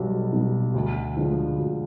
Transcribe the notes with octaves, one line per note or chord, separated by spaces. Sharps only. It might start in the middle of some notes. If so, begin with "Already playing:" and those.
Already playing: B1 B2 G3
B2 G3
D2
D3 F3 G#3
D2